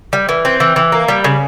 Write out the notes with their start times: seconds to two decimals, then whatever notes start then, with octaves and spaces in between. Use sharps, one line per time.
0.13 G3
0.29 E3
0.45 C4
0.60 E3
0.76 E3
0.92 A#3
1.08 G3
1.24 C#3